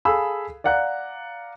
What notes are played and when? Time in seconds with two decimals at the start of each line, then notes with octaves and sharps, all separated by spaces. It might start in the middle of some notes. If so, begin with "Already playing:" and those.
0.05 G#4 A4 F5 B5 E6
0.64 D5 F5 F#5 A#5 F#6